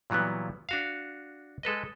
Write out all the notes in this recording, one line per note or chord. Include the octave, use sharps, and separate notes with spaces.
A#2 E3 F#3 G3 B3
D4 F#4 F5
G#3 A4 B4 D#5